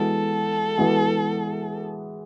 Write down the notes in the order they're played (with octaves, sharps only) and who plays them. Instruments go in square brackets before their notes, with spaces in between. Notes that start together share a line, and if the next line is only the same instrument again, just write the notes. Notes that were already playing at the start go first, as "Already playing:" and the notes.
Already playing: [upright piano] E3 G#3 B3 F#4 [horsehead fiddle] A4
[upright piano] E3 G#3 B3 F#4